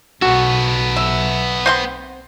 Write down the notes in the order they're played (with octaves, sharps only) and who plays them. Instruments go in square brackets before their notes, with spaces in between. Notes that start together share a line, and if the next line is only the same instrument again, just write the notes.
[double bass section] B1 [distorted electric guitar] B3 A4 [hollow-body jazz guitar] F#4
[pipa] E5
C4 F5 C6